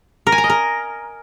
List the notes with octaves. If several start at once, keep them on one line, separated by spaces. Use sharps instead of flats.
A#4
G#5
A#5
D#5
A#4